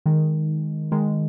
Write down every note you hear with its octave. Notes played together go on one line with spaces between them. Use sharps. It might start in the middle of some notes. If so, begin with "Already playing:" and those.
D#3 G#3
D#3 G#3